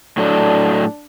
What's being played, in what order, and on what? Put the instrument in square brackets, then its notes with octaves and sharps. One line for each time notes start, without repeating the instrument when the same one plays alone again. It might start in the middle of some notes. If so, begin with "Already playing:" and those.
[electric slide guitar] A2 F#3 A4 [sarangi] D4